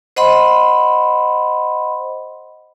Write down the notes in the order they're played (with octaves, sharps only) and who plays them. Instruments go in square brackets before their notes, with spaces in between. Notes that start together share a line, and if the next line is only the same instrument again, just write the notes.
[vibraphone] C5 D#5 F#5 B5 C6